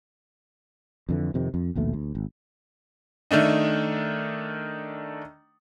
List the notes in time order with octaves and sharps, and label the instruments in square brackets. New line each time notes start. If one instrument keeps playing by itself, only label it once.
[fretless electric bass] F2 D3 E3
F2 C3 D#3
F2
A#1 D#2 B2 A3
D2
G#1
[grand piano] D#3 A3 D4 D#4